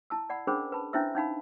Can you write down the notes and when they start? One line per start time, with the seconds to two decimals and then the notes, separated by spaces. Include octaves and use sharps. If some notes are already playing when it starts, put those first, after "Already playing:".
0.10 E4 A5 E6
0.30 D5 F#5 B5
0.47 C#4 D4 G#4 A#4 C5 B5
0.72 B4 A5 B5
0.93 C#4 D4 E4 C5 E5 E6
1.15 C#4 D#4 F5 B5